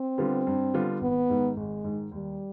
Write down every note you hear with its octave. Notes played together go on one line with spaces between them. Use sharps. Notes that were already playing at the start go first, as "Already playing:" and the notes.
Already playing: C4
D3 G3 B3 F4
G2
D3 G3 B3 F4
G#1 B3
G#2 D#3
G#1 G#3
G#2 D#3
D#2 G3